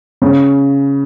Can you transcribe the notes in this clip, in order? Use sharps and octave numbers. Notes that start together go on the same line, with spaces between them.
C#3